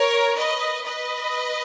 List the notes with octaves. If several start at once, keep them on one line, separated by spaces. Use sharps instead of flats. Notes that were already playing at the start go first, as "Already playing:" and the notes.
Already playing: A#4 C#5
B4 D#5
B4 D#5